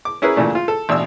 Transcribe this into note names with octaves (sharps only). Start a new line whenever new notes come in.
D6
C#4 E4 G#4 A#4 B4
A#2 C#3 E3 A3 D4
F4
A4
A1 B2 D4 E6